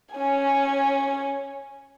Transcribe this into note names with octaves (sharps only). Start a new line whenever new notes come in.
C#4 G#5